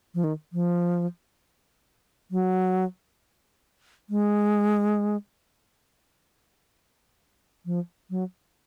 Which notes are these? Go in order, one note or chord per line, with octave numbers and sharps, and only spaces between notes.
F3
D#3
F3
F#3
G#3
F3
F#3